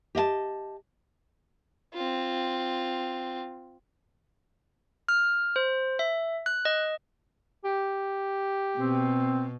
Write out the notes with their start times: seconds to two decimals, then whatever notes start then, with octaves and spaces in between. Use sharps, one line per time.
0.15 G4 D#5 E5 A5
1.94 C4 F4
5.08 F6
5.56 C5
5.99 E5
6.46 F#6
6.65 D#5
7.64 G4
8.78 B2 C4